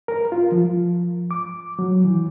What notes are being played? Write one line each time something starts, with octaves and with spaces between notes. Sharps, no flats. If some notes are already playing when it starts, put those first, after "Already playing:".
A#4
F4
F3
D6
F#3
E3